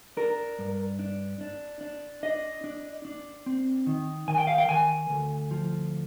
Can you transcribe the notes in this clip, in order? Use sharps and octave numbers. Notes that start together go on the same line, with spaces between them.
D4 A#4
G2
D4
D4
D4
D4 D#5
D4
D4
C4
D#3
D#3 G#5
G5
F5
G5
D#3 G#5
D2
F3